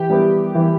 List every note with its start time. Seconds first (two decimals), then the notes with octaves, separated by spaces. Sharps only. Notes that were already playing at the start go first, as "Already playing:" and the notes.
Already playing: E3 G4
0.10 G3 B3 E4
0.55 E3